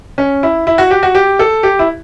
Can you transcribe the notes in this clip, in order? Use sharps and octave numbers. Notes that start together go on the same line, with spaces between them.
C#4
E4
E4
F#4
G4
F#4
G4
A4
G4
E4